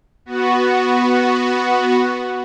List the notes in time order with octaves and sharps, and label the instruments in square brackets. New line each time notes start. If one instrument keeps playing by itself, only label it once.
[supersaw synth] B3 F#4